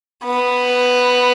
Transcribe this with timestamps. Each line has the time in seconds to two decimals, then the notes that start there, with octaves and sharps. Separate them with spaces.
0.24 B3